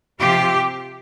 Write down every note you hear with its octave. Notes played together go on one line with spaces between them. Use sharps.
C3 F3 C4 F4 G4